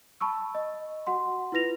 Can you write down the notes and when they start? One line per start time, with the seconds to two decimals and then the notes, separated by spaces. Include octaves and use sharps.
0.21 A5 B5 C#6 E6
0.55 D#5
1.07 F#4 F#5 C6
1.52 E4 F4 B4 A#6 F7